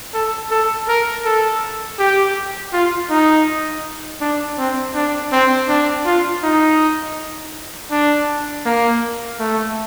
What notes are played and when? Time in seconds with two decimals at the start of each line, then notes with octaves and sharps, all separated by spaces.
0.14 A4
0.51 A4
0.88 A#4
1.25 A4
1.99 G4
2.73 F4
3.10 D#4
4.21 D4
4.58 C4
4.95 D4
5.32 C4
5.69 D4
6.06 F4
6.43 D#4
7.91 D4
8.65 A#3
9.39 A3